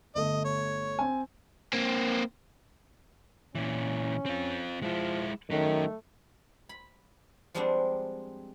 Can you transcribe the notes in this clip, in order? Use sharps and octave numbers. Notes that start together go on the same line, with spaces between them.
G1 A3 D#5
C#5
C4 G#5
A#3 C4
A#2 E3 C#4
C4 F4
F3 G#3 E4
D#3 F#3 A3 C#4
B5
F3 G3 G#3 C4 D4 F#5